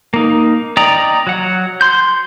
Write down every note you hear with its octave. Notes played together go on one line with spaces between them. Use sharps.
A#3 D#4
D5 D#5 G5 A#5 D#6
F#3 F#5
C6 G6